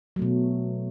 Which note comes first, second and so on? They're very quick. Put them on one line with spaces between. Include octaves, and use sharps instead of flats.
F#3 A3 B2